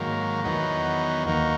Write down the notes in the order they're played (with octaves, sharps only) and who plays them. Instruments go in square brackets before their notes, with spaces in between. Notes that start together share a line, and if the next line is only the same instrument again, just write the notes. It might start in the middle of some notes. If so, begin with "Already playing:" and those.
Already playing: [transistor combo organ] G#2 D#3 F#3 A#3
E2 D#3 F#3 B3 D#4
D#2 D#3 A#3 D#4 F#4